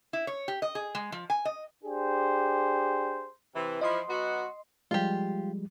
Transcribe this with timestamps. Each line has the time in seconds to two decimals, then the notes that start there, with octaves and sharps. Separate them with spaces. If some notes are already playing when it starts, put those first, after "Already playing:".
0.13 E4
0.27 C#5
0.48 G4
0.62 D#5
0.75 G#4
0.95 G#3
1.12 F3
1.30 G#5
1.45 D#5
1.84 D4 G4 G#4 C5
3.55 C3 E3
3.81 E3 F3 D#5 C6
4.08 F#3 B3 F#4
4.91 F3 G3 G#3 F4 G4